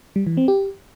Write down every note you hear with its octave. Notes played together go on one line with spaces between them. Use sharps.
G3
E3
C4
G4